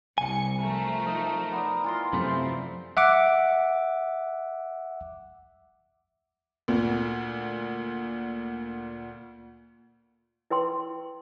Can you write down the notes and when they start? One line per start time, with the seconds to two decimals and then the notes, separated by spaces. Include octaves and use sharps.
0.18 C2 G#5 C#7
0.59 F3 A3 A#4
1.06 D#4
1.52 B3 D5
1.84 E3 F4 C6
2.13 F#2 C3 F3 A3 C4
2.97 E5 F#5 D6
6.68 D2 A#2
10.50 E4 B4 G5 C6